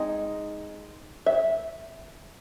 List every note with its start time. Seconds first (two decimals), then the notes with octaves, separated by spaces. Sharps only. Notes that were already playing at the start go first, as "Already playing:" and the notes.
Already playing: G#3 C4 D#4 D#5
1.26 E5